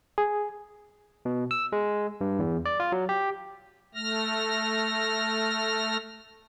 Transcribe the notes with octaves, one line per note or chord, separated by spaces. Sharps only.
G#4
B2
E6
G#3
G2
E2
D5
F4
F#3
G4
A3 F6 A#6